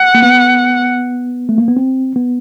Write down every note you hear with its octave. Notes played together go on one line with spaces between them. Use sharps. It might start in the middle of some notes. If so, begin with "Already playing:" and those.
Already playing: F#5
A#3
B3
A3
A#3
B3
C4
B3